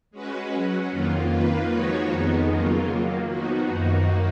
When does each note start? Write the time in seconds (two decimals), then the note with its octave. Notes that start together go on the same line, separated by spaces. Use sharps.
0.11 G#3 C#4 F#4 B4
0.50 F#3 C#4 F#4
0.90 F2 D#3 A#3 F4
1.30 D#3 A#3 F4 B4
1.70 F3 G#3 D#4 F#4 C#5
2.09 F2 D#3 G#3 B3 D#4
2.49 C#3 F#3 A#3 F4
2.89 D#3 F#3 A#3
3.29 F3 B3 D#4 F#4
3.68 F#2 D#3 A#3 D#4 F#4